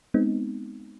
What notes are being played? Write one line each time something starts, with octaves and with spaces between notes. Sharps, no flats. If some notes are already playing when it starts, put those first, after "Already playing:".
G#3 B3 C4 D#4